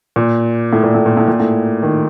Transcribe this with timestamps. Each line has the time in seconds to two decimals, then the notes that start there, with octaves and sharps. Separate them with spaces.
0.16 A#2
0.73 A2
0.83 A#2
0.94 A2
1.06 A#2
1.17 A2
1.28 A#2
1.40 A2
1.83 D#3